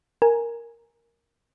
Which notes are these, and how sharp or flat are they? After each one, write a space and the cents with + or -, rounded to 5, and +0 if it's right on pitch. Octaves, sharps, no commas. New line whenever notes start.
A#4 +0 G#5 +0